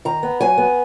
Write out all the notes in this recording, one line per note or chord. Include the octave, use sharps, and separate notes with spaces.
D#3 A#5
B3
F#3 G#5
B3